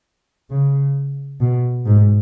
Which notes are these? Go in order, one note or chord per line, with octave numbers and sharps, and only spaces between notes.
C#3
B2
G#2